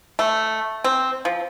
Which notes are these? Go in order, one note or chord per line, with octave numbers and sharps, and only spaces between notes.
A3
C4
F3